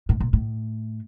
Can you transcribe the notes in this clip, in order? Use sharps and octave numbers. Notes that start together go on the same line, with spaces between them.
A2
A#2
A2